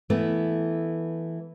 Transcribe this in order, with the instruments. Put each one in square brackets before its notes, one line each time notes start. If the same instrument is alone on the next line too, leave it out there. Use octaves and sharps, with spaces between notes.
[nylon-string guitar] E3 A3 B3